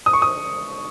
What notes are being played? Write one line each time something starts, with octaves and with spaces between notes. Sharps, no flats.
D#6
C#6
D#6